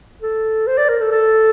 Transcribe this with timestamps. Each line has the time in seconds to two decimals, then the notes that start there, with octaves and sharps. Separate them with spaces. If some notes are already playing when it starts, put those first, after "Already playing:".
0.22 A4
0.67 C5
0.78 D5
0.89 A#4
1.01 A4
1.12 A4